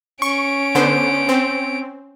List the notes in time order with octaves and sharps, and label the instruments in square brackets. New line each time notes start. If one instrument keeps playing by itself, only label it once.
[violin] C#4 D7 [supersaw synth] C#6
[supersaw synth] D3 B3 C5
C4